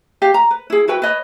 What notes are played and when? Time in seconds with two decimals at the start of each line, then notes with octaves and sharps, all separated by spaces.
0.22 G4 D5 F5
0.34 A#5
0.51 B4
0.70 E4 G#4
0.88 E4 F#4 B4 G5
1.02 B4 C#5 D#5 B5